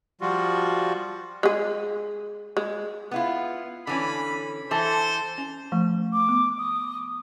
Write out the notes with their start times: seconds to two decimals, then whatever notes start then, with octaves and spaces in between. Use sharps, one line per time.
0.21 F3 G3 F4 F#4
1.43 G#3 G#4
2.57 G#3
3.11 B3 E4 F4
3.87 D3 E3 C#4 B5
4.71 E3 A4 C5
5.38 C#4
5.72 F3 A3
6.13 D6
6.29 B3
6.59 D#6